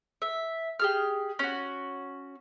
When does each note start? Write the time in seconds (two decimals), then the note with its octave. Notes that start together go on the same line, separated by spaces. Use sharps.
0.22 E5
0.79 G4 G#4 F6
1.39 C#4 F#4